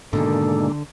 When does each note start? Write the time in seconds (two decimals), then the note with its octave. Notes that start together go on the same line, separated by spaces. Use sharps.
0.13 G#2 B2 D3 D#3 G#3 A#3 D4 A4